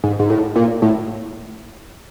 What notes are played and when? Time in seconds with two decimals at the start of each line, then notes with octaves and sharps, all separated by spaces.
0.04 G#2
0.19 G#2
0.30 A2
0.56 A#2
0.82 A2